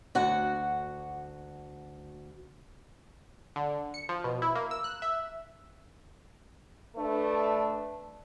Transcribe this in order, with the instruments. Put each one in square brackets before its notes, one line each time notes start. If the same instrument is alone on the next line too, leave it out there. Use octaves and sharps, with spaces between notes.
[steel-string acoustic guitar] D2 F#4 F#5
[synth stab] D3
C#7
F3
B2
E4
A#3
E6
F#6
E5
[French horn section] A3 D4 B4